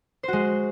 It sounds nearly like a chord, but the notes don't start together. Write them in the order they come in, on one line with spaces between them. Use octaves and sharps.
C5 F#4 G#3